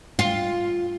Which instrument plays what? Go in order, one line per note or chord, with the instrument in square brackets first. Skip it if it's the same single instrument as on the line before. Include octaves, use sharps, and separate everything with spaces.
[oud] F4